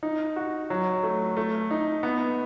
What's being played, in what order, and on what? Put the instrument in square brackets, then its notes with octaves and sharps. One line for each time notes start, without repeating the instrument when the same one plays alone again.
[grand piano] D#4
F#4
F#3
A3
A3
D#4
B3